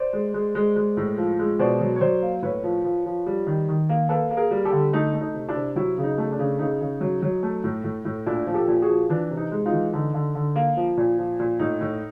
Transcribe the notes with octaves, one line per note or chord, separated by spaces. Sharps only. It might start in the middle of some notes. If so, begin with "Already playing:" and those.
Already playing: C5 D5
G#3
G#3
G#3
G#3
A2
F3
G#3
B2 C5 D5
F#3
C#5
F#3 C5 D5
A#3
A2 B4 C#5
F3
F3
F3
G3
D#3
D#3
A#3
A#3 A4 B4
A#3
G#4 A#4
G3
G4 A4
D3
A3 D#4
A3
D#4
C3
D4 E4
C3
F#3 E4 F#4
C#3
D#4
A3
D4
C#3
C#3 D#4
C#3
F#3
F#3
A3
A2
A2
A2
A#2 D4 E4
F3
G4 A4
A#2
F#4 G#4
F3
E3 D4
C3
D#4
G#3
D#4 F4
E3
D3 D#4
D3
D3
A#3
F3
A#2
F3
A#2
A2 D#4
A2